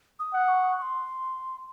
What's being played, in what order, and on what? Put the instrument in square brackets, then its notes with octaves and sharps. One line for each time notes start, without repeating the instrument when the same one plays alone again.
[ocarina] D#6
[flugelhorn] F#5
[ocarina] C#6
C#6
C6